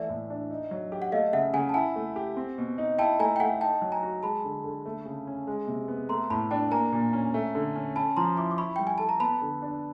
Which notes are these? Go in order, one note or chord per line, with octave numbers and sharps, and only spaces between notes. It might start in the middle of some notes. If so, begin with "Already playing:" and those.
Already playing: E3 A3 D5 E5
A2
D4
D#4
F#3
G4
F#5
A3 D#5 F5
C#3 E5 F#5
C#3 F#5 G#5
A5
E4 F#5 G#5
A3
G4
C4
B2
D#4
E4 G5 A5
A3 G#5 A#5
G5
A3 F#5 G#5
D#4 G5 A5
F#3
G#5 A#5
F#4
G#3 A5 B5
D3
D3
A3
C#3
C#4
G#3
C3
B3
A3 A#5 C6
A2 A5 B5
D4 G5 A5
A#3 G#5 A#5
A#2
C#4
A3
D3
C#4
C#4 A5 B5
F3 A#5 C6
E4 C6 D6
D6
E4 B5 C#6
G3 G5
G#5
A4 A5
A#5
B3 A5 B5
D3
D4